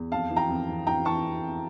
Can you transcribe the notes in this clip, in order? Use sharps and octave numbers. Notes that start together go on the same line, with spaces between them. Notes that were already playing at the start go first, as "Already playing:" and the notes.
Already playing: E2
F2 F5 A5
E3
G5 A#5
F2
E3
E3 G5 A#5
E3 A5 C#6